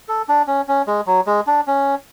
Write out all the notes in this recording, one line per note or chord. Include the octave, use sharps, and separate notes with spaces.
A4
D4
C#4
C#4
G#3
F#3
G#3
D4
C#4